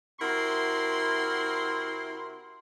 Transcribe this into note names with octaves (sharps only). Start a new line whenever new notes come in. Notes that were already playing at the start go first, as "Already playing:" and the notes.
C3 E4 F#4 A#4 C6